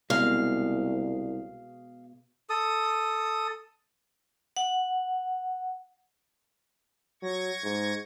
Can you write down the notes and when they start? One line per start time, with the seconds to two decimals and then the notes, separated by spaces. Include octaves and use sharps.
0.10 C2 B2 G#3 F5
2.50 A4 D#6
4.57 F#5
7.22 F#3 C#6 G#6 A#6
7.64 G#2